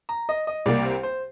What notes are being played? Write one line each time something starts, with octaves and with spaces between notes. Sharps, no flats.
A#5
D#5
D#5
C2 C3 G3 A#3 D5
C5
C5